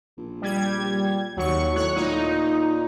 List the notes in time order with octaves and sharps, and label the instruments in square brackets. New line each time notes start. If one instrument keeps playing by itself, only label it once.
[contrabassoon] A#1
[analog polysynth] G3 G#6
[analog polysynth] D#2 C#6 [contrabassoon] F#3
[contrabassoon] A2 [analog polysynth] C#5 C#6 F#6
[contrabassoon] A#2 [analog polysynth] D#4